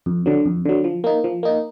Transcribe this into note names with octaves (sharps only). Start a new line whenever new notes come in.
F2
D3 F#3
F2
D3 F#3
F3
A#3 D#4
F3
A#3 D#4